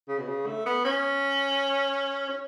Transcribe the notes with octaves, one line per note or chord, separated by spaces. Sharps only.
C#3
B2
C#3
A3
B3
C#4
C#4